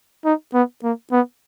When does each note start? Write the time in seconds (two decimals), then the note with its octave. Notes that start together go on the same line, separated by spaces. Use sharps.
0.25 D#4
0.54 B3
0.83 A#3
1.12 B3